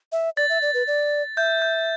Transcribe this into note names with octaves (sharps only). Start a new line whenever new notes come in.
E5
D5 A6
E5
D5
B4
D5
E5 G6
G6